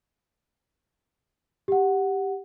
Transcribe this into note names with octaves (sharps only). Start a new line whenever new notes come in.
G4 F#5